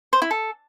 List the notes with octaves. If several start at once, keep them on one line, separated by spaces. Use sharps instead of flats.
C5
E4
A4